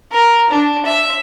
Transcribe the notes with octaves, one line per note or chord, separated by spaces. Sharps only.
A#4
D4
E5